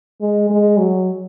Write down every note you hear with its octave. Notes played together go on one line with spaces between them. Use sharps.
G#3
G#3
F#3